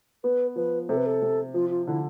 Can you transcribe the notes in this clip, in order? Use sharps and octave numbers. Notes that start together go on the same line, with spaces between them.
B3 B4
F3 B4
C3 A4
B4
A4
C3
F3 F4
F4
D3 E4